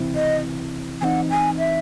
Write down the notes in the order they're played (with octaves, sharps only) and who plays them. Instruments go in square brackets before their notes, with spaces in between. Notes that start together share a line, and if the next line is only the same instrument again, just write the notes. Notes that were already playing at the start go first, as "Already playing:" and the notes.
Already playing: [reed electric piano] C#2 C3 E3 C4 E4
[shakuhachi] D#5
[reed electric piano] E3 C4 D#4 [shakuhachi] F#5 G#5
[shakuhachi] G#5
E5